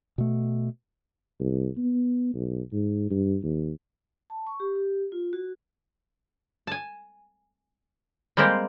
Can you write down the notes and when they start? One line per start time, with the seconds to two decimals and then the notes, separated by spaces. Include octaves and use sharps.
0.18 B2 A3
1.40 C2
1.77 B3
2.34 B1
2.72 G#2
3.10 G2
3.43 D#2
4.30 A5
4.47 C#6
4.60 G4
4.76 G4
5.12 F4
5.33 F#4
6.67 G#5 A5
8.37 G3 G#3 A#3 C4 G4